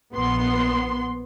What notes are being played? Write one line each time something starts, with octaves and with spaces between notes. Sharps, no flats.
A#1 B3 C6